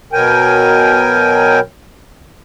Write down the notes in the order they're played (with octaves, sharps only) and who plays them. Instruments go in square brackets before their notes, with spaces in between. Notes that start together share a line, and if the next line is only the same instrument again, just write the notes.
[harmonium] B2 F#3 A#4 G5 G#5